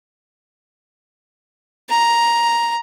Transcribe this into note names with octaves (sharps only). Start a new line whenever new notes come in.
A#5